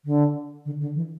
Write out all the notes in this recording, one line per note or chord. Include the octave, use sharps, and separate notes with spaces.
D3
D3
D3
E3